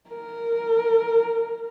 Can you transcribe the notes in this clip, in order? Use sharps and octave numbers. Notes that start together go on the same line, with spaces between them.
A#4